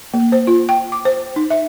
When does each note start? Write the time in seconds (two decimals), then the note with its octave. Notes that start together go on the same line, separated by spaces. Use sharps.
0.14 A#3
0.32 C5
0.47 F4
0.69 G5
0.92 D6
1.05 C5
1.36 D#4
1.50 E5